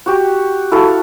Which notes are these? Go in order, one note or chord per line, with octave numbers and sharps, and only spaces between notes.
F#4 G4
E4 F#4 A4 F5